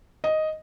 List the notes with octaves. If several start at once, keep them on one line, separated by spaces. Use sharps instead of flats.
D#5